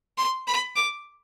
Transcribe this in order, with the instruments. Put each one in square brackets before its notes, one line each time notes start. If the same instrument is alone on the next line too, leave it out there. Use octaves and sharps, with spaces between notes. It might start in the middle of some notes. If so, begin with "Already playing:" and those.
[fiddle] C6
B5
D6